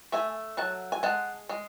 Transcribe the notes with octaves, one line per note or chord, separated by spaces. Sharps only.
A3 E5 G#5
F#3 F#5 A5
G#5
G#3 F#5 A5
G#3